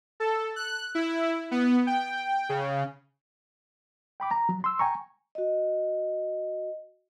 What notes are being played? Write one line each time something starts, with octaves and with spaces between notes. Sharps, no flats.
A4
F#6
E4
B3
G5
C#3
G5 B5 D6
A#5
F#3
C6 E6
G5 G#5 A#5 C#6
F#4 D#5